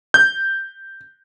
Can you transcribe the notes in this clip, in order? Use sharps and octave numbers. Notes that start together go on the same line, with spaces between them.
G6